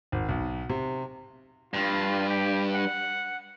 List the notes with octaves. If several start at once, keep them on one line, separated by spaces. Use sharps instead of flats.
G#1
B1
C3
G2 F4
G4
F#5